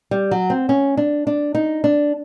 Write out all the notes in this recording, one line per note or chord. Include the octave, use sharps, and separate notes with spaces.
G3
F#3
C4
C#4
D4
D4
D#4
D4